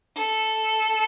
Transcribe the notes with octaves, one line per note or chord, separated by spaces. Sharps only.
A4